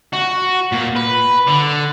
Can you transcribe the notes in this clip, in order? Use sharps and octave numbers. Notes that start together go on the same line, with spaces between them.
F#4
A#2
B4
D3